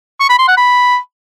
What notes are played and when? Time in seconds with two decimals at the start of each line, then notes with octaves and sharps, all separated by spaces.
0.20 C#6
0.29 B5
0.39 C6
0.48 F#5
0.57 B5